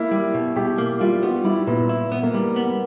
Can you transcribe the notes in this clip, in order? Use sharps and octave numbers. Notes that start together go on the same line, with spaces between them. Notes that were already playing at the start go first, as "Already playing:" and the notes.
Already playing: A#3 E4
G3
B2
B2 G4
A#3
G3 F4
B3 F#4
G3 E4
A#2 B3
E4
B3
A#3
G3
B3